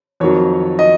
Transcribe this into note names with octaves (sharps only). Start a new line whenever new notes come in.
F2 D#3 F#3 C#5
D#5